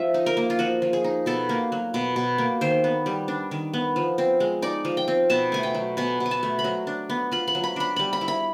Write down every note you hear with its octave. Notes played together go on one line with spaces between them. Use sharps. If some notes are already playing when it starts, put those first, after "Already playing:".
Already playing: F3 E5
D#4
A#4
A#3
F4
F3 F#4
F3
G#4
D#4
B2 A4
A#3
F#3
B2
B2
A#3
D#3 C5
B3
G3
D4
D#3
B3
F3
C4
G#3
D#4 D5
F3
G5
C4
B2 A5
A3 G#5
G5
F#3
B2 G#5
B2
G#5
A5
A3
B5
F#3 A#5
D4
B3
F4 B5
B5
F#3
B5
D4 B5
G3 B5
B5
E4
B5